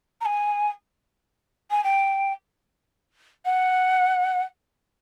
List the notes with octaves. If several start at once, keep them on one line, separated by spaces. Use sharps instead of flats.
A#5
G#5
G#5
G5
F#5